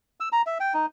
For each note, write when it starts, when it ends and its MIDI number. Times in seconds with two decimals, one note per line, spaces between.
0.20 0.29 88
0.32 0.42 82
0.46 0.58 76
0.60 0.73 79
0.74 0.86 63